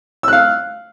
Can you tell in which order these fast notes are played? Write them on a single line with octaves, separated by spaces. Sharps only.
E6 F#6 F5